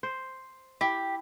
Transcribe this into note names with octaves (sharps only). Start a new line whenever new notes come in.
C5
E4 G4